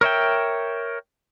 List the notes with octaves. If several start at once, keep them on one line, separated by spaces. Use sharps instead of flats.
A#4 C#5 E5 G5